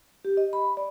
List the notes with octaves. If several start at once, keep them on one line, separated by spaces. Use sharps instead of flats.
G4
D#5
B5
D5